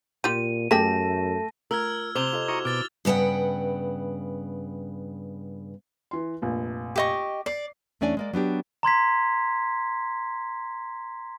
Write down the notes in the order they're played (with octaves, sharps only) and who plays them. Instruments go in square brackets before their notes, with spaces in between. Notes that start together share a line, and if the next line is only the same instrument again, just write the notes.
[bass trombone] A#2 [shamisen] F4 G4 [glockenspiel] D#7
[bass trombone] F#2 [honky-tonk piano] A3 [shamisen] G4 G#4 G5 [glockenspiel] A5 A#6
[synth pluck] A3 F4 [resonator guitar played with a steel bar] A#4 [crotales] E6 F6 G#6
[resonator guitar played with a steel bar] C3 C5 [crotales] D6 F7 G7
[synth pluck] F4 A4 D#5
[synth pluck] E4 F#4 [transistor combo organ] A#5 C#6 D#6
[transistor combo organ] B2 D6 [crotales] F6 A6 G7
[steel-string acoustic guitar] G2 C#3 B3 F#5 G5
[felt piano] E3 C6
F1 A#1
[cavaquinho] G4 D#5 C#6
[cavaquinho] D5 [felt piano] C7
[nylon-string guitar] E2 A3 C#4 D4 D5 G#5
G#3 A#3 D5
F#3 B3 D4 G4
[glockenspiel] A#5 C6 G#6 B6